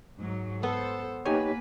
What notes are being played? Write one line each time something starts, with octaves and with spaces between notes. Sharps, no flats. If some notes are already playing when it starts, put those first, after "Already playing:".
G#2 F#3
B3 A4 C5
A#3 D#4 G4 B4 C#5 G#5